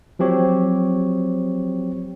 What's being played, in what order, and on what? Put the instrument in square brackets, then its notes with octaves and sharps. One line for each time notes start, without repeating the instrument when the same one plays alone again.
[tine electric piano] F3 F#3 C4 G4 C#5